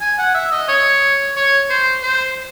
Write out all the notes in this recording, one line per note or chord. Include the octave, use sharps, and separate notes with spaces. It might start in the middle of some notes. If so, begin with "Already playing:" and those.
G#5
F#5
E5
D#5
C#5
C#5
C5
C5